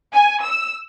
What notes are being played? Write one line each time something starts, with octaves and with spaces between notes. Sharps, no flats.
G#5
E6